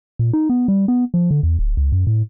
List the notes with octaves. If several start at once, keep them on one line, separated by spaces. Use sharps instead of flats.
A#2
D#4
B3
G3
B3
F3
D3
E2
D1
C#2
F#2
A2